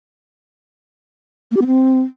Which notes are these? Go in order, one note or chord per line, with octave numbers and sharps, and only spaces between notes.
A#3
G4
B3
C4